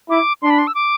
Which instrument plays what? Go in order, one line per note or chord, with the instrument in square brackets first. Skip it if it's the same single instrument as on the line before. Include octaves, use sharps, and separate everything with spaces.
[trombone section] E4 [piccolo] D6
[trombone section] D4 [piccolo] C6
[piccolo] B5
C6
E6
D6